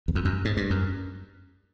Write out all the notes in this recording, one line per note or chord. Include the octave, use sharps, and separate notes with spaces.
E2
F2
F#2
G#2
G2
F#2